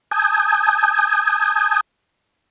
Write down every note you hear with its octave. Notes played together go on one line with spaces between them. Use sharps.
G#5 A5 D#6 G6 G#6